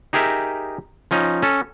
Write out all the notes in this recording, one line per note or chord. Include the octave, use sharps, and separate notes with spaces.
D#4 G4 G#4 A#4 E5
F3 C#4 D#4
C#4 A4